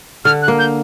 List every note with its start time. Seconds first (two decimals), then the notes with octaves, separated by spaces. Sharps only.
0.25 D3 F6
0.42 F#6
0.48 A#3
0.59 G6